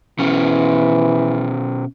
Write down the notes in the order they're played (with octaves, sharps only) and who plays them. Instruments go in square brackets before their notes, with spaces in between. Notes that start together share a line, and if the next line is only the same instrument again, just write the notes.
[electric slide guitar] B2 C#4 [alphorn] E3